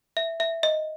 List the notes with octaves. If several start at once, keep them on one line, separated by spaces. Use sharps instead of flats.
E5
E5
D#5